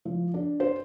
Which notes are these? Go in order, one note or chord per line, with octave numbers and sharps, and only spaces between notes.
F3
D4
C5